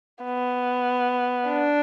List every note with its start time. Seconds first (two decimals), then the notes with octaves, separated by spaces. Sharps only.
0.24 B3
1.49 D4